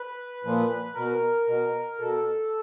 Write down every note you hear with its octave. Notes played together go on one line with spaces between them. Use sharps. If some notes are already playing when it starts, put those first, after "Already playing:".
Already playing: B4
A#2 F3
B2 A#4
B2
B2 A4